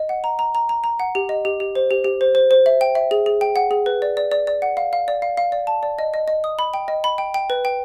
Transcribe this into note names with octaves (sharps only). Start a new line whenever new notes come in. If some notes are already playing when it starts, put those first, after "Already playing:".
Already playing: D#5
F#5
A#5
A#5
A#5
A#5
A#5
F#5
G4
D#5
G4
G4
C5
G4
G4
C5
C5
C5
E5
G5
E5
G#4
G#4
G5
F#5
G#4
B4
D5
D5
D5
D5
F#5
F5
F5
D5
F5
F5
D5
A5
D5
D#5
D#5
D#5
D#6
B5
G5
D#5
B5
G5
G5
B4
G5